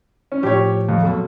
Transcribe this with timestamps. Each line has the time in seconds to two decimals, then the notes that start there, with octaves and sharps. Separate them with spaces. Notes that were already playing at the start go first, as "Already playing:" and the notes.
0.32 C#4
0.43 A2 F3 G4 C#5
0.89 F2
1.03 F2 B2 F#3 A4